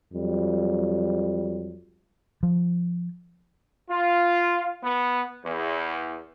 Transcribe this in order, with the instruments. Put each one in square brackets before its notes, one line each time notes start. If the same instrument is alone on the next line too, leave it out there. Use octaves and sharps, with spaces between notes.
[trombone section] F2 F#3 G3
[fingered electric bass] F3
[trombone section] F4
B3
E2